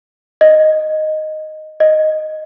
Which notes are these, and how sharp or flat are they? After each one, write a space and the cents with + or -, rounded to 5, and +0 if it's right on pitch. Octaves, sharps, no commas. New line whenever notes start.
D#5 -5
D#5 -5